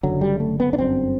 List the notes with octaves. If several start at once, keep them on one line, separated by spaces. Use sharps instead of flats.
F#1 F#2 D3 F#3
G3
A3
B3
D4
G1 F#2 D3 C4